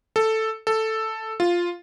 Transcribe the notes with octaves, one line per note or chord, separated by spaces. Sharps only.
A4
A4
F4